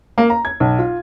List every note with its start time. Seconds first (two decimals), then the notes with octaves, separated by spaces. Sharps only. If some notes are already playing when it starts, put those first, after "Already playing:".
0.18 A#3
0.30 A#5
0.45 G#6
0.60 B1
0.78 F4